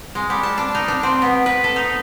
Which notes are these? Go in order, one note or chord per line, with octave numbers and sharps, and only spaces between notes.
G#3
G3
A5
D4
D#4
D4
C4
B3
B4
A4
D#4